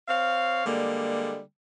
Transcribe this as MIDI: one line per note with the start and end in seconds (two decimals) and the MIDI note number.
0.08 0.64 60
0.08 0.64 73
0.08 0.64 77
0.65 1.39 50
0.65 1.39 55
0.65 1.39 56
0.65 1.39 58